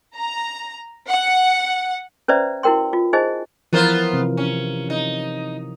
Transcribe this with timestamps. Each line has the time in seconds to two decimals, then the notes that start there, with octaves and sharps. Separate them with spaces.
0.14 A#5
1.07 F#5
2.28 C#4 B4 C5 D5 E5 A#5
2.63 E4 F#4 A#4 G5 C6
2.93 F4
3.13 D#4 G#4 C5 D#5 G#5
3.73 E3 F3 B3 F4 A#4 C5
4.13 C3
4.37 C#4
4.90 D#4